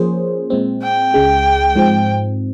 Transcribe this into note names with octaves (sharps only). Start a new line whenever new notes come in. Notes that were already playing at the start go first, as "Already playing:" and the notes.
Already playing: F3 A#3 C#4 G#4 C5
A#2 G#3 C4
G5
C#2 C#3 G#3
G#2 F3 C4